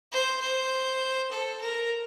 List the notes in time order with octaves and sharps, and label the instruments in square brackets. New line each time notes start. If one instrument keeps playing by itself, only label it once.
[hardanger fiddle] C5
C5
A4
A#4